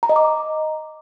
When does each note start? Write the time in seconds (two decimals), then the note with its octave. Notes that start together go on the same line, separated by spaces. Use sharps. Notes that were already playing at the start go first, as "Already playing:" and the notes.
0.03 A#5
0.09 D#5
0.16 D6